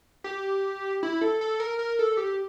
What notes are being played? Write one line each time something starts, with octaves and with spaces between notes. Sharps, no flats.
G4
E4
A4
A4
A#4
A#4
A4
G4